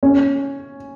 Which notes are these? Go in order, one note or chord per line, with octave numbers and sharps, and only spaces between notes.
C#4